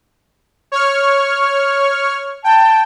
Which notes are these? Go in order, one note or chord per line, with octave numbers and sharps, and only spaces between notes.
C#5 C#6 F6
G5 A5